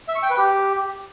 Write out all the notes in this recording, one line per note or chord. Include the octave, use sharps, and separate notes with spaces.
E5
C#6
G5
B4
G4